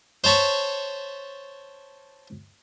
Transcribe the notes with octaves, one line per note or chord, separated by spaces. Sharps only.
C5 C#5 A5 B5 C#6